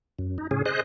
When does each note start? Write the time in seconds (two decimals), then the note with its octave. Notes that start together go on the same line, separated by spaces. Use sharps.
0.19 F#2
0.38 D#4
0.51 A2 C#3 C#4 G#4
0.66 G#4 C5 D#5 F#6